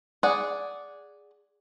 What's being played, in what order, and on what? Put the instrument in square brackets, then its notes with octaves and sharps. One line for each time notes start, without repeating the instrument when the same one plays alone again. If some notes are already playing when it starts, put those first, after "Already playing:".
[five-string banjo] G#4 D5 F#5